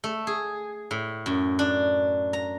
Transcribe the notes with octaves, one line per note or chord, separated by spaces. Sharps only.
A3
G#4
A2
F#2
D4
A#5